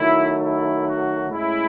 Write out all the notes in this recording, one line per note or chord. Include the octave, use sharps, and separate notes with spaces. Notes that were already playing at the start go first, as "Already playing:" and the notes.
Already playing: D#3 F#3 A3 E4
E4
F#4
A2 G#3 C#4 E4